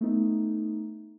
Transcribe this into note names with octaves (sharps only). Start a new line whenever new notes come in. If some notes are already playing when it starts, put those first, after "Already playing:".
A3 B3 D#4